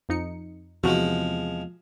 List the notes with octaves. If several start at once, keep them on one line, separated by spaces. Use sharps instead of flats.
F2 D#4 C#7
E2 C3 F3 G#3 F#4